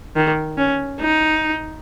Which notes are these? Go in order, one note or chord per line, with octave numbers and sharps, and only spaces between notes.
D#3
C#4
D#4